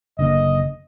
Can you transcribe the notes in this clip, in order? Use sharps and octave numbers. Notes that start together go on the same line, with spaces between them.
F#1 D3 A#3 D#5